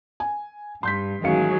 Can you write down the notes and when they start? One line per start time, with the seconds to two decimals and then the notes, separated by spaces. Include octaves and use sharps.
0.20 G#5
0.83 G2 C6 G6 B6
1.24 A1 D#3 F#3 G#3 F5 C#7